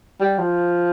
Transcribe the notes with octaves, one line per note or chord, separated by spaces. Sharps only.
G3
F3